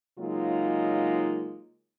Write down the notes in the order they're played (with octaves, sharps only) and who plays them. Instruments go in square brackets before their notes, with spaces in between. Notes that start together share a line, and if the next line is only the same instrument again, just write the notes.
[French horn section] C#3 F#3 G#3 A#3 D#4 F4